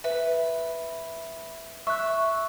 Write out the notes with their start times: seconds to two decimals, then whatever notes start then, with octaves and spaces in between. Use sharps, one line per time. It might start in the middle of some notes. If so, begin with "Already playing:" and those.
0.04 B4 E5
1.87 E5 C#6 F#6